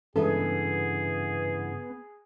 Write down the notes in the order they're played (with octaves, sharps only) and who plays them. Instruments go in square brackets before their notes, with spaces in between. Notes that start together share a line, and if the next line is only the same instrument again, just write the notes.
[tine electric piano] G2 C#3 [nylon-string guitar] E3 G#3 A4 [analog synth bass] B3 [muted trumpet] G#4